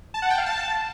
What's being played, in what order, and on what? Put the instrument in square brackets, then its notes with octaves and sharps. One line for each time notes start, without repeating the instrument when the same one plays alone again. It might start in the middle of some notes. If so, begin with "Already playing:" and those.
[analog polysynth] A5
F#5
G5
F5
A5